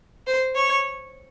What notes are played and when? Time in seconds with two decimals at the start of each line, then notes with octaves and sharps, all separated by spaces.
0.27 C5
0.55 C#5